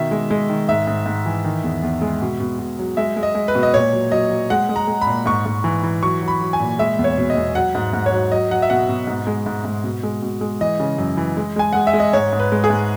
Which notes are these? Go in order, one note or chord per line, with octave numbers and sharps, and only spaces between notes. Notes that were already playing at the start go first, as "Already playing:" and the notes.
Already playing: B2 D#3 E5
G#3
G#3
D#3
G#2 E5
G#2
G#2
E3
D#3
E2
E2
G#3
B2
B2
B2
F#3
G#3 E5
G#3
D#5
G#3
B4
B2
D#5
A#2 C#5
F#3
F#3 D#5
F#3
G#3 F#5
G#3
A#5
G#3
B5
A#2
G#2 C#6
G#2
E3
E3
F#3 C#6
F#3
B5
F#3
G#5
A#2
G#3 E5
E2
C#5
B2
D#5
E2
F#3 F#5
G#2
G#2
C#5
F#3
F#3 D#5
F#3 F#5
E5
B2 F#5
B2
G#2
G#3
G#2
G#2
B2
G#3
B2
G#3
E3 D#5
C#3
F#2
E3
G#3
G#3 G#5
G#3 F#5
E5
G#3
D#5
G#2 C#5
G#2
B4
G#3
G#4
G#2